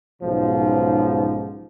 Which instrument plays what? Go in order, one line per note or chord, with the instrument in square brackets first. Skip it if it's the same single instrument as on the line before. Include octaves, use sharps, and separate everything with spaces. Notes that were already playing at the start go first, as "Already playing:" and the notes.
[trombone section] B1 G#2 C#3 F3